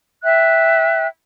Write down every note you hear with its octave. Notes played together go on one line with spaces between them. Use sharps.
E5 G5 F#6